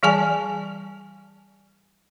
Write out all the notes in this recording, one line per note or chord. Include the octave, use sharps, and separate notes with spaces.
E3 G3 G#4 D5 G#5 A5